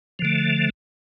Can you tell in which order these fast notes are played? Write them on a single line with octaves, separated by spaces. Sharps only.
F3 D3 A3